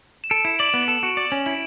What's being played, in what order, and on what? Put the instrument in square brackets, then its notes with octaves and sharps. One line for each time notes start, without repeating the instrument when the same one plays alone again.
[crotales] E7
[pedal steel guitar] A4 [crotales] D7
[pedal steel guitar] E4 [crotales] E7
[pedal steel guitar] D5 [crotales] F#7
[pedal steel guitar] B3
[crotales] F#7
[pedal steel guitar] A4 [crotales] E7
[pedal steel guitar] F#4
D5
C#4
[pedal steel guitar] E4 [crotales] F#7